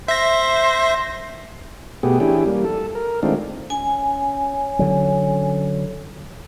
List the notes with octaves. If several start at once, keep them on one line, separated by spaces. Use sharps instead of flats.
C5 E5 A#6
B2 A3 B3 G4 G#4
E3 C#4 D4 E4 G4 G#4
G3 A#3
A4
A#4
D#3 G#3 A3 C4 D4 F4
C#4 G#5
D3 F#3